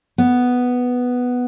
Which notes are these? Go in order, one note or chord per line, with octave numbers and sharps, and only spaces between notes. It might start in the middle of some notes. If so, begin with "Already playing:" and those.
B3